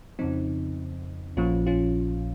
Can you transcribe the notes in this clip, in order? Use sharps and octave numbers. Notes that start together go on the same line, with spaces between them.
F2 C#3 F3 C4 D#4
A#1 A#2 F3 C#4 F4
C#4 F4